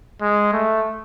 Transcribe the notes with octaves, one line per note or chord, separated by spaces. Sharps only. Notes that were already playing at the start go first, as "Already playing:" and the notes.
G#3
A3